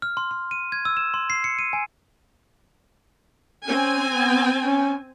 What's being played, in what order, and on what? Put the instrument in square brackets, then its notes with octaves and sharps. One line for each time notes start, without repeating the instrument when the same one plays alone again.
[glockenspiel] F6
C6
C6
D#7
G#6
E6
E7
C6
C7
C#7
D#7
G#5
[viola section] C4 G#5 [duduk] C#4
[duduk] B3
C#4